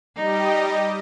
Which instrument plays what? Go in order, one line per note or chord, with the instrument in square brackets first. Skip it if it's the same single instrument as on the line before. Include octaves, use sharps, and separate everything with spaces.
[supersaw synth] G3 G4 D#5 [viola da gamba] D#4